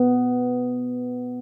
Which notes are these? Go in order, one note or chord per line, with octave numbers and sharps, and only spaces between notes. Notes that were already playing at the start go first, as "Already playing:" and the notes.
Already playing: B3